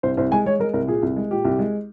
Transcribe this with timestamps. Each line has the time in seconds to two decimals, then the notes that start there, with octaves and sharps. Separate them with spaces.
0.03 C2 C5
0.17 C2 C5
0.31 G#3 G#5
0.46 G#3 C#5
0.59 G#3 A#4
0.74 C2 A#4
0.88 A#2 G#4
1.03 C2
1.17 G#3
1.31 A#2 G4
1.45 C2
1.59 G#3